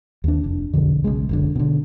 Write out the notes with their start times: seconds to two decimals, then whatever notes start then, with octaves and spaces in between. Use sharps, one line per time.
0.24 D#2 D4
0.44 F1 D4
0.73 E1 B1 F2 D3
1.04 B1 C#3 G#3
1.29 F#1 B1 D3
1.56 B2 D3